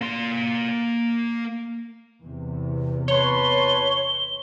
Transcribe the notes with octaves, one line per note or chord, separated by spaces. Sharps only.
A#3 C6
E2 C3
B4 C#5 A5 C6 G7